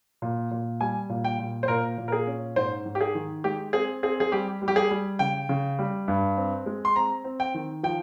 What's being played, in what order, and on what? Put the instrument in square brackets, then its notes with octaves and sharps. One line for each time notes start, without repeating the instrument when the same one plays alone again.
[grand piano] A#2
A#2
G3 G#5
A#2
G5
A#2
C5
A#2 A#4
A#2
A#4
G#4
C#4
G#2 C5
G#2
G4
G#4
D#3
G#3 G4
C4 G#4
C4 G#4
G#4
G3 G4
G3
G4
G#4
G3
C#3 G5
C#3
G3
G2
C4
G#3
C6
C4 A#5
C4
G5
D#3
F3 G5